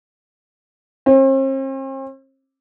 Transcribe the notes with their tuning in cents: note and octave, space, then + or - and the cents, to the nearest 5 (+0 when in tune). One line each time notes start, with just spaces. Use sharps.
C4 +45